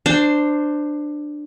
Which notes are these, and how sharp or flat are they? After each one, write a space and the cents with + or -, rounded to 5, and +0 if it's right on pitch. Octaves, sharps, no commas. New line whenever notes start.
D4 +15 C5 -5